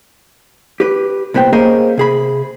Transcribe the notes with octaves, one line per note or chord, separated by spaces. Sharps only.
G4 B4
C2 A#2 B3 C5 G5
A#3 C#4 G#4 A#4 C5 D#5
C3 G#4 B5